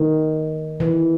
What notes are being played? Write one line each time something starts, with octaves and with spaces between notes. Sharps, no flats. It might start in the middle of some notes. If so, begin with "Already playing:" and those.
Already playing: D#3
E3